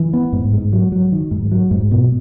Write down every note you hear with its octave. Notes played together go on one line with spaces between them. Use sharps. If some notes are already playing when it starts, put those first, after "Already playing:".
Already playing: E3
B3
G#2
G#2
F#3
F#3
D#3
G#2
F#3
G#2
B2